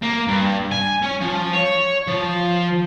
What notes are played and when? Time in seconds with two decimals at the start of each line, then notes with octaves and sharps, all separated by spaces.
0.02 A#3
0.27 G2
0.72 G#5
1.03 C#4
1.21 F3
1.53 C#5
2.07 F3